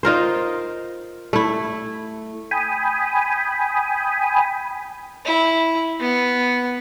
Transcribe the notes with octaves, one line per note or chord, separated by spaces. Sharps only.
D#4 F4 A#4 C5
A3 E4
G5 G#5 B5 D#6
E4
B3